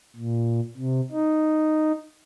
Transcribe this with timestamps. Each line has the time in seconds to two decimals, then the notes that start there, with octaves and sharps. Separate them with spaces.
0.16 A#2
0.76 C3
1.12 D#4